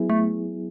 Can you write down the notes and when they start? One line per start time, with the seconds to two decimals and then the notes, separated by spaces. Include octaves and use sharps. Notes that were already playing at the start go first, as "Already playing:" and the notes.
Already playing: F#3 B3 E4 G#4
0.10 A3